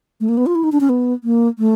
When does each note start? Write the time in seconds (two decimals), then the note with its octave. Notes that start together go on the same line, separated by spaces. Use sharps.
0.20 A3
0.29 A#3
0.37 B3
0.46 F4
0.55 E4
0.64 D#4
0.72 D4
0.80 C#4
0.89 B3
1.24 A#3
1.59 A3